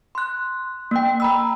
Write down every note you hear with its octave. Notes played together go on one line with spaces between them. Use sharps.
C6 F#6
A#3 G5
A#5 B5 E6